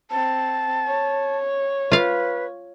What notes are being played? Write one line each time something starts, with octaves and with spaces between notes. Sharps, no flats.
C4 A5
C#5
F4 B4 F5